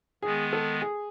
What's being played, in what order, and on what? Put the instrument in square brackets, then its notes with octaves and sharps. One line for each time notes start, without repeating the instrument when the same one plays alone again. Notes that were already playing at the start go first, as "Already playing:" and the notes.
[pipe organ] D#3 G#3 B3 [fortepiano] G#4
[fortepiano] A4
G#4